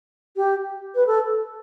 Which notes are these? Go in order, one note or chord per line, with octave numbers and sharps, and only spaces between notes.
G4
B4
A4